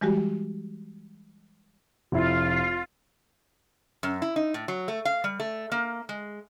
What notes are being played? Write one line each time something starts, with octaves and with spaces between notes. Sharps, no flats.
E3 G3 G#3 F#4 G4
F1 E4 F4
F#2
E4
D#4
A2
F#3
A3
F5
G3
A3
A#3
G#3